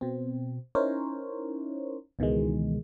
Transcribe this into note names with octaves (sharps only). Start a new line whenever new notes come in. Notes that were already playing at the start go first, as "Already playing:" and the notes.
B2 C4
C#4 D#4 E4 A#4 C5 C#5
C#2 B2 D#3 E3 G#3